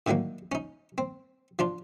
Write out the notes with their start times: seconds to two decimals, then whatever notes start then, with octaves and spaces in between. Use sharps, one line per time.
0.07 A2 D3 D#3 F#3 A#3
0.52 C#4 D#4
0.98 C4
1.59 F3 D4 F4